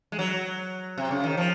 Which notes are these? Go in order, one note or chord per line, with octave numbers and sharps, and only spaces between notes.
G#3
F#3
C3
C#3
D#3
F3